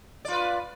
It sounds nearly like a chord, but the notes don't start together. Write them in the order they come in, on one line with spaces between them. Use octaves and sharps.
D5 F4 B4